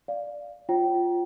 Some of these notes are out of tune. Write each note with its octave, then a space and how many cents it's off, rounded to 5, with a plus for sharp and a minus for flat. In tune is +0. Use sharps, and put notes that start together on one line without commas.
D5 +0 F5 +0
F4 +0 C#5 -45 G5 -25